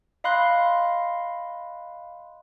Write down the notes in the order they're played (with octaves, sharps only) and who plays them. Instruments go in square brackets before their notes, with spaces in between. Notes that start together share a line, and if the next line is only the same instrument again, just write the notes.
[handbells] D#5 F5 B5 C6 F#6